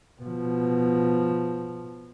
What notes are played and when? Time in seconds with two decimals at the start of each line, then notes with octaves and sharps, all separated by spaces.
0.21 B2 F3